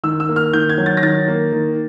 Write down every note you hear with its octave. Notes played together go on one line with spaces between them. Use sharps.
D#3 E6
E6
A#3
F6
D#3 G6
G#6
F#3
A6
A#6
D#3 A6
A#3
D#3